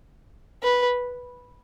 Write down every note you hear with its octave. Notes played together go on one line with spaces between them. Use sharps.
B4